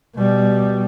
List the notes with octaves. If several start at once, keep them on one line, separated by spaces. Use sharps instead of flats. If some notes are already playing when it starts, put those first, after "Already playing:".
B2 G3